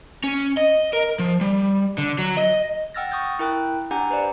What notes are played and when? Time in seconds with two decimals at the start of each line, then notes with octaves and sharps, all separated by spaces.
0.24 C#4
0.57 D#5
0.93 A#4
1.19 F3
1.41 G3
1.98 D3
2.18 F#3
2.37 D#5
2.94 F#5 G5 E6 F6 A6 A#6
3.11 C#6 D#6 E6 G6 A6
3.39 E4 A#4 G5 F#6
3.91 D4 G4 F#5 G#5 A#5 G6
4.10 B4 C5 D5